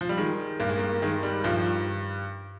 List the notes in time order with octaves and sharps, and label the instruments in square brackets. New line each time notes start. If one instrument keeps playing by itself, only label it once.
[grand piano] F3
G3
D#3 G#3
G2 A#3
G#3
A#3
D#3 G#3
G3
G2 F3